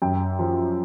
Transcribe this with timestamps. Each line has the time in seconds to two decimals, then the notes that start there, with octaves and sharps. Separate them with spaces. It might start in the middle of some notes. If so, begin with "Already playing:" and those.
0.02 F#2 G5
0.39 F3